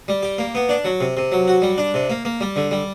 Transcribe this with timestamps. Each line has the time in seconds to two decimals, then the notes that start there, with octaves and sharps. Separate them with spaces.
0.08 G3
0.23 G4
0.38 A#3
0.55 B3
0.69 D4
0.85 F#3
1.00 C3
1.17 C3
1.32 F#3
1.48 F#4
1.62 G3
1.78 D4
1.94 C3
2.10 A#3
2.25 A#3
2.41 G3
2.56 D3
2.71 G3